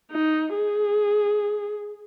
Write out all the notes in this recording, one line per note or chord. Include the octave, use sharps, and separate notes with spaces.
D#4
G#4